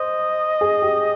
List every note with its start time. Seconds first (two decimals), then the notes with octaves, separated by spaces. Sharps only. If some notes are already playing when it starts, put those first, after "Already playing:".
Already playing: C5 D#5
0.61 G#4
0.82 G4